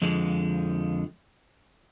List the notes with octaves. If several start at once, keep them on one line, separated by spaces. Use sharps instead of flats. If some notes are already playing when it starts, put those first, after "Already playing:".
F2 D3 F3 G#3